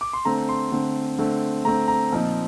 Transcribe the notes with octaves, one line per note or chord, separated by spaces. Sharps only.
D6
C6
D3 A3 C4 A#5
C6
D3 A3 C4
D3 A3 C4
D3 A3 C4 A#5
A#5
A#2 F3 C4 D#4